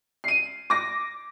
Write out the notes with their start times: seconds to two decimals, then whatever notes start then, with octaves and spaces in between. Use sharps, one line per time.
0.24 C7 D#7
0.70 D6 A#6